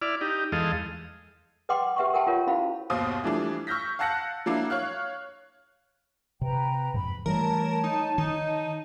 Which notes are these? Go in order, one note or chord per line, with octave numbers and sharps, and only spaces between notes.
E4 D5 F6
D#4 G4
E2 G#3 A4 D#5 F5
B4 D#5 F#5 G5 C6 D6
G4 B4 E5 F#5 C6 C#6
A#4 E5 F#5 G5 A5 C6
F4 A#4 C#5
C#4 E4 F#4 C5 F5 B5
G1 D#2 B2 C5 F5 D#6
E3 F3 G3 A3 D4
C#6 E6 F6 G6 A#6 B6
F5 F#5 A5 F#6 A#6 C#7
F#3 A#3 D4 E4
C#5 F5 F6 F#6
C3 B4 G5 A#5
F2 G#2 B5
E3 G3 A3 A#4 C#5 A5
D#4
D#3 D#4